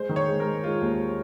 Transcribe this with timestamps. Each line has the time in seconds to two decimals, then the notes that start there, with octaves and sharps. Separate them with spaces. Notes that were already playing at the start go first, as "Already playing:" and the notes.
Already playing: G#3 C5
0.09 D#3
0.16 C#5
0.28 G#3
0.40 A#4
0.46 G#3
0.64 G#3 F4
0.81 D#2